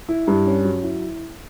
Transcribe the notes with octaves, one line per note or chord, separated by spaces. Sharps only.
E4
G2
C#4
F#3
E4